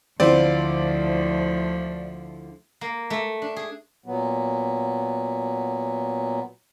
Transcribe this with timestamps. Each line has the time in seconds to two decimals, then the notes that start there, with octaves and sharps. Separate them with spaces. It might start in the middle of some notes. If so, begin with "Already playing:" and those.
0.20 D2 D3 F3 C4 E4 F4 D5
2.81 A#3
3.10 A3
3.42 D4
3.56 G#4
4.06 A#2 F#3 B3